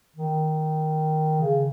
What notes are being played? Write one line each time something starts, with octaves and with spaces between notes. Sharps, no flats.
D#3
C#3